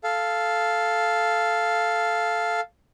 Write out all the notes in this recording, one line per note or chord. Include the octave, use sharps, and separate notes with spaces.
A4 F5